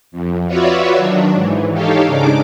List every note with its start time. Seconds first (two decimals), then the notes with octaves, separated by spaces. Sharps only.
0.12 F2
0.47 F4 F#4 B4 C#5 D5 E5
0.97 D#3 F#3 D4
1.34 G#2 E3
1.73 D#4 G4 A4 C#5 F5
2.06 G#2 C#3 D4 D#4 D6